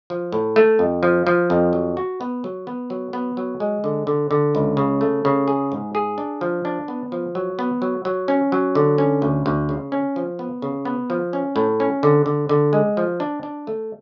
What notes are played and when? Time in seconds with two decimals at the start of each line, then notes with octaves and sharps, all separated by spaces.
0.10 F3
0.32 A2
0.56 A3
0.79 F2
1.03 F3
1.27 F3
1.50 F2
1.73 F#3
1.97 F#4
2.21 B3
2.44 F#3
2.67 B3
2.90 F#3
3.13 B3
3.37 F#3
3.60 G#3
3.84 D3
4.07 D3
4.31 D3
4.55 C#2
4.77 C#3
5.01 A3
5.25 C#3
5.48 G#4
5.72 G#2
5.95 G#4
6.18 D4
6.41 F3
6.65 D4
6.88 B3
7.12 F3
7.35 F#3
7.59 B3
7.82 F#3
8.05 F#3
8.28 C#4
8.52 F#3
8.75 D3
8.98 C#4
9.22 D2
9.46 D2
9.69 C#3
9.92 C#4
10.16 F3
10.39 B3
10.62 C#3
10.85 B3
11.10 F3
11.33 C#4
11.56 A2
11.80 C#4
12.03 D3
12.26 D3
12.49 D3
12.73 G#3
12.97 F3
13.20 D4
13.43 D4
13.67 A3